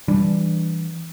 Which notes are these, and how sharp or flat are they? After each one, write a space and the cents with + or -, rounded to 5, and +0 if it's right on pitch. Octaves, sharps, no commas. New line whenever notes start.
E3 +0 G3 +0 D4 +0